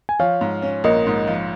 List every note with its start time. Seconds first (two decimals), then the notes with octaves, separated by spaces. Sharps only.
0.09 G#5
0.19 F3 C#5 F5
0.41 G#2
0.62 C#4
0.84 A#1 A#4 D#5
1.06 G#2
1.27 F3